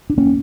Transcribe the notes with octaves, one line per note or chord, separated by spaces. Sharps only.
D4
A#3 C#4